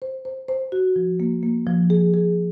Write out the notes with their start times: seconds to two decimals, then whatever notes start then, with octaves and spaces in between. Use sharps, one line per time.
0.02 C5
0.25 C5
0.48 C5
0.72 F#4
0.96 F3
1.20 A#3
1.43 A#3
1.67 F3
1.90 G#4
2.14 G#4